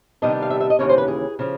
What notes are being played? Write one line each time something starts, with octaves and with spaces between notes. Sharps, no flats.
C3 D#3 G3 B3 D4 D#5
F5
E5
E5
D#5
D#2 C#3 E3 C#4 C#5
C5
B4
G#4
C#3 F3